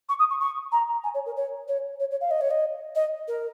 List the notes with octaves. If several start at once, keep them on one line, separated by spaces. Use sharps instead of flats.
C#6
D#6
C#6
C#6
A#5
G#5
C#5
A#4
C#5
C#5
C#5
C#5
F5
D#5
C#5
D#5
D#5
A#4